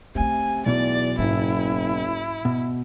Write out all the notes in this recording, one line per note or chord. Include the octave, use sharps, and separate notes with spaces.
C3 A3 C#4 G#5
B1 E2 B2 D5
F#1 G#2 E4
B2